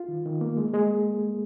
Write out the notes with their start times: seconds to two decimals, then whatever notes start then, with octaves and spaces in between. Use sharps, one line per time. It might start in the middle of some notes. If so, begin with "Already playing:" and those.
Already playing: F4
0.08 D#3
0.25 D#3
0.41 A#3
0.57 G#3
0.74 G#3